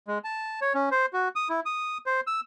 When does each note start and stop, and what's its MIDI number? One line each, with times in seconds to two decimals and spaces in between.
0.08 0.18 56
0.24 0.60 81
0.61 0.73 73
0.74 0.89 61
0.91 1.06 72
1.13 1.28 66
1.36 1.48 87
1.49 1.60 64
1.66 1.98 87
2.06 2.21 72
2.27 2.40 88